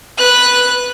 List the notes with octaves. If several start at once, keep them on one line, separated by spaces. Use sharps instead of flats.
B4 F#6